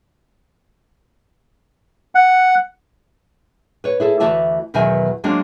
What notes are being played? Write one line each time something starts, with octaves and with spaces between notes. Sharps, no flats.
F#5
B4 C#5
E4 G#4 A4
D2 E3 F#4 D5 E5 A5
E2 B2 D#3 F#3 E5 G#5
F#3 G#3 A#3 C4 D4 F#4